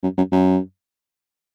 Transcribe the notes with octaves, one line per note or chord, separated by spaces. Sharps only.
F#2
F#2
F#2